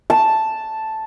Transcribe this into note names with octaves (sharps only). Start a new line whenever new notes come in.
A5